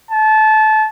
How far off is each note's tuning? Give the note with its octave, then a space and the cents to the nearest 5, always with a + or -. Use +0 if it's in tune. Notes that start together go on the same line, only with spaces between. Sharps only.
A5 -20